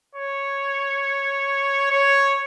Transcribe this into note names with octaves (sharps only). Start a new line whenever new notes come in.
C#5
C#5